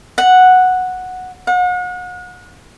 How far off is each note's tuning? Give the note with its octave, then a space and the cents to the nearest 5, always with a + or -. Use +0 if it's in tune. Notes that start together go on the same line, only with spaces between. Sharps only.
F#5 -5
F#5 -40